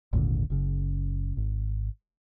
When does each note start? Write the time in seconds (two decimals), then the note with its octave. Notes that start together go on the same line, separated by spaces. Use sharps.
0.13 G#1 D#2 A#2 D3
0.50 F#1 C#3
1.37 G#1